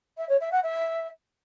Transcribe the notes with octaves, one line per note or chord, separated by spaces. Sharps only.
E5
C#5
E5
F#5
E5